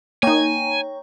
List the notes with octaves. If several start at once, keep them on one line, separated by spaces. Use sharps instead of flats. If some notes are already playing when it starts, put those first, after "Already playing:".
A#3 D#4 C#5 G5 G#5 A#5